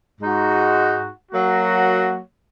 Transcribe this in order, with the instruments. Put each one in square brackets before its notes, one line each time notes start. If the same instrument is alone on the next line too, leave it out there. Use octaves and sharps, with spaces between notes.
[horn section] G#2 G#3 D#4 F#4
F#3 A#3 F#4